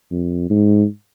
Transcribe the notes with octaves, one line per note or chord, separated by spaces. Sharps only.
F2
G#2